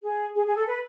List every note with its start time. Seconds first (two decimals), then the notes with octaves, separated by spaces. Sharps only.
0.03 G#4
0.35 G#4
0.45 G#4
0.55 A4
0.66 B4